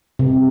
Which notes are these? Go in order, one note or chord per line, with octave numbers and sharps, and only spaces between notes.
C3